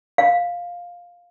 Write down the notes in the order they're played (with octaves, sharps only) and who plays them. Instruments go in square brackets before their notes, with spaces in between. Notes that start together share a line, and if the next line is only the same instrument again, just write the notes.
[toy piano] F5